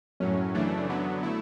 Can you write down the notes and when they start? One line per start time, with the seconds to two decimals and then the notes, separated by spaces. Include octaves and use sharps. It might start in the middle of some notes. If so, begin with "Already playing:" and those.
0.20 F#2 A2 F#3 C#4
0.55 C#3 E3 A3 D4
0.89 D3 F#3 B3
1.23 A3 E4